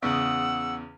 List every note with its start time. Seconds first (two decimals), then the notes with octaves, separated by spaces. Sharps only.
0.02 E2 C#3 F#5 E6